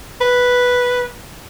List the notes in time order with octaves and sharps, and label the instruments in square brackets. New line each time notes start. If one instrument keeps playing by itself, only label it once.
[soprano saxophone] B4